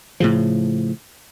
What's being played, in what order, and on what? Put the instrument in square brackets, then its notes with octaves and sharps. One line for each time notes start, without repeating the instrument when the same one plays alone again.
[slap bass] A2 C#3 F3